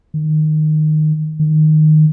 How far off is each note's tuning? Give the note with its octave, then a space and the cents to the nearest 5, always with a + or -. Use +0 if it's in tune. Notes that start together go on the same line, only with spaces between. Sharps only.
D#3 -15
D#3 -10